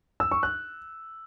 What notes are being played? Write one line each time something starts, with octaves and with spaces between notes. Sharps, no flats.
E6
C#6
F#6